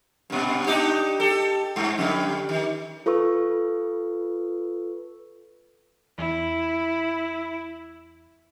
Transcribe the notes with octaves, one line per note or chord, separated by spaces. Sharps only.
G2 A#2
D4 D#4 G4
G4 A4
G2
F2 D3 G3
D#3
F4 A4 B4 C#6 E6
E2 E4